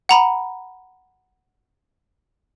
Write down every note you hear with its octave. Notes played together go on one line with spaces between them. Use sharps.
F#5 A#5 B5